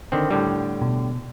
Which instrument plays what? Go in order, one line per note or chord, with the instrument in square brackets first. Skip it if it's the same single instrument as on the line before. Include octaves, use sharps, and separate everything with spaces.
[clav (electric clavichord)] D3 D#3 C4
A2 D3 G3
[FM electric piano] B2